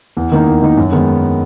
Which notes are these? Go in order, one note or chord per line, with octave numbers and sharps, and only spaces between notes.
E2
D#3 A#3 D#4
E2
D#3 A#3 D#4
F#2
D#3 G#3 B3